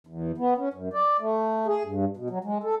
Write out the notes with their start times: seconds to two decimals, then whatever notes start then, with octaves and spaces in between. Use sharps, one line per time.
0.07 E2
0.38 B3
0.58 C#4
0.74 F#2
0.93 D5
1.20 A3
1.67 G#4
1.85 G2
2.17 B2
2.30 F#3
2.44 G#3
2.63 A4